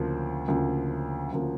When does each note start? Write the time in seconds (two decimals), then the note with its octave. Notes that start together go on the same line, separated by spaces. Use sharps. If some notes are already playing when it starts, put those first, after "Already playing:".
Already playing: D2 C#3 F3 A#3
0.48 D2 C#3 F3 A#3
1.32 D2 C#3 F3 A#3